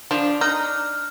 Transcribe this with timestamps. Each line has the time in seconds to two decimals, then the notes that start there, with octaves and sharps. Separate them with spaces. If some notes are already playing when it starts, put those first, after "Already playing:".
0.11 F3 D4
0.41 D#4 F6